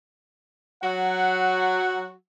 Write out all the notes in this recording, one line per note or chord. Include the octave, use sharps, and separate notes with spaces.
F#3 F#4 F#5